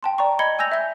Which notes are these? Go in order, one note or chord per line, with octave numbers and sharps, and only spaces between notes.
G5 A5 C6
D5 A#5 C#6
D#5 B5 G#6 C#7 G7
G#5 E6 G6 A#6 F7
E5 G6